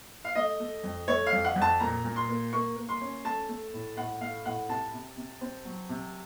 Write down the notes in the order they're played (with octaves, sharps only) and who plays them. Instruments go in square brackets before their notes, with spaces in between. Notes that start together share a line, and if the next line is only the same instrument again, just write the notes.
[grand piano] F5
A3 D#5
A3
F2
A3 C#5
F5
F2
F#5
F2
A5
A#2 A#5
A#2
C6
A#3
A#3 C#6
A#3
C6
C#4
A3 A5
A3
A2
A2 F#5
A3 F5
A2 F#5
C3 A5
C3
C3
C4
F#3
C3